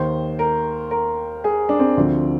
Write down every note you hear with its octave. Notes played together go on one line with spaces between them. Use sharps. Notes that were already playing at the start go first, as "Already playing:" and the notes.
Already playing: D#2 D#3 C5
A#4
A#4
G#4
D4
C4
D2 D3 F3